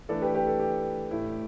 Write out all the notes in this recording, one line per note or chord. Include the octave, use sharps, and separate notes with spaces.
E3 A3 D4 A4 D5
G4 B4
G4 B4
A4
G4
A2 A3 E4